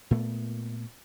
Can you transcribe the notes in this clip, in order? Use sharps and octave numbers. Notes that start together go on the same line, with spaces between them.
A#2 A3 B3